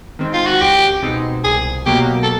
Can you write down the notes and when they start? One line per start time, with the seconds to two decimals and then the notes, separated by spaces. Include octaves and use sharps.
0.19 D#3 G#3 C4
0.34 F4
0.47 F#4
0.61 C#2 G4
1.02 B2 G#3 C4 D#4
1.44 C2 G#4
1.86 B2 F#3 A#3 G4
2.23 A4